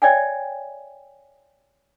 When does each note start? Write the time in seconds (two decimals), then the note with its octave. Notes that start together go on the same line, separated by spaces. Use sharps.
0.02 C#5 D5 E5 G5 G#5